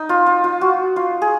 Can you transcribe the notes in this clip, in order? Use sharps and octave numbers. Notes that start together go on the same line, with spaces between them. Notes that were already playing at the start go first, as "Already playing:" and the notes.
Already playing: D#4
F4
F4
F4
F#4
F4
G#4